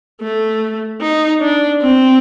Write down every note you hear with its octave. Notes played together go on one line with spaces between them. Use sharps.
A3
D#4
D4
C4